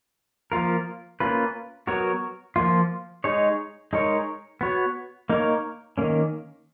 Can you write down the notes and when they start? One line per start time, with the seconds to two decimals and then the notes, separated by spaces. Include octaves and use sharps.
0.52 F3 A#3 F4 A#4
1.20 A#3 C#4 F4 B4
1.87 F#3 B3 F#4 A#4 C#5
2.56 F3 A#3 F4
3.24 G#3 D#4 G#4 C#5
3.93 G#3 D#4 A#4 C#5
4.61 B3 F#4 C#5
5.30 A#3 D#4 A#4 C#5
5.98 D#3 A#3 C#4